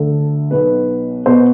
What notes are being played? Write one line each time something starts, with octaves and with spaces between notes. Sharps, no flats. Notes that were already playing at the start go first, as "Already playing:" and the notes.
Already playing: D2 D3 A4
B1 B2 B4
B2 C5